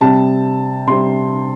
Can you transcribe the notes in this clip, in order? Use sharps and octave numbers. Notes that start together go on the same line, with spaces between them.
C3 G3 C4 A5
C3 G3 C4 C6